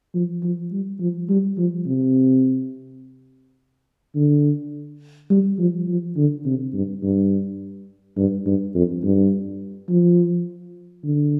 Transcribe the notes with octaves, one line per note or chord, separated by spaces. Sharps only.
F3
F3
G3
F3
G3
F3
C3
D3
G3
F3
F3
D3
C3
G2
G2
G2
G2
F2
G2
F3
D3